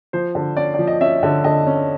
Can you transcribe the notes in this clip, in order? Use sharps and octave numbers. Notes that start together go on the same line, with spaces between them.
F3 C5
D3
C#4 D5
F3 D5
D#5
C#4 E5
D3
D3 D#5
C#4